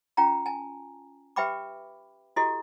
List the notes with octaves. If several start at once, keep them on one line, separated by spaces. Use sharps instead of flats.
C#4 F4 G5 A#5
G#5 A5
G4 B4 E5 G5 B5 D6
E4 F#4 G4 A4 D#5